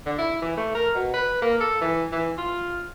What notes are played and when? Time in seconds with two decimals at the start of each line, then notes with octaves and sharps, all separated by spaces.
0.06 D3
0.18 E4
0.42 E3
0.57 A3
0.74 A#4
0.95 B2
1.14 B4
1.42 A#3
1.60 A4
1.81 E3
2.12 E3
2.38 F4